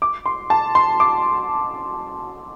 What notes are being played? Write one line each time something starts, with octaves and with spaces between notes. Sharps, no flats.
D6
C6
A5
C6
D6